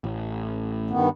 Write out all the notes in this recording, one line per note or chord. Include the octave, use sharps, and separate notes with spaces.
A1
G2 D#3 B3